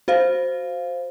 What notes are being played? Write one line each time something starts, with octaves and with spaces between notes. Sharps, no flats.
F#4 C5 F5